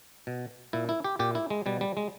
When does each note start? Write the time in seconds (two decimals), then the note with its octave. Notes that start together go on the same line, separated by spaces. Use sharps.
0.27 B2
0.73 A#2 E4
0.89 E4
1.04 G4
1.19 A#2 G4
1.35 E4
1.50 G#3
1.66 B2 G3
1.81 G3
1.97 G#3